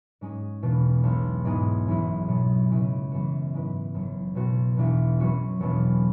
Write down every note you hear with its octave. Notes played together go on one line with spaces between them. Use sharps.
G#2 G#3 C#4 G#4
E1 E2 B2
B1 B2 B3
G#2 G#3 B3 E4 G#4
G#1 F#2 E3 G#3 E4
B2 F#3 B3 G#4
C#2 C#3 G#3 C#4 E4
F#2 E3 B3 F#4
G#2 G#3 E4 B4
F#1 F#2 F#3
B1 B2 B3 F#4
E1 E2 E3
F#2 F#3 C#4 F#4 B4
E1 E2 B2 F#3 B3